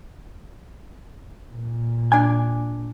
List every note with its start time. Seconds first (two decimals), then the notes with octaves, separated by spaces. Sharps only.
1.52 A#2
2.12 D4 G#5